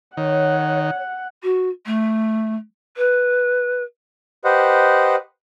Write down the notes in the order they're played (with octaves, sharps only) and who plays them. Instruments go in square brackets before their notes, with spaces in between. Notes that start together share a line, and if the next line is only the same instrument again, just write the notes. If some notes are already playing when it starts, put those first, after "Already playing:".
[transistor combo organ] D#3 [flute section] C#5 [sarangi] F#5
[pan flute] F#4
A3
B4
[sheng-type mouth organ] G4 B4 C5 D#5 F#5